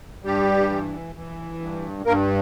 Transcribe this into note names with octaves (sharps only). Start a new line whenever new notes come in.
G2 G3 G4
E3
E3
G2
G2 A#3 A#4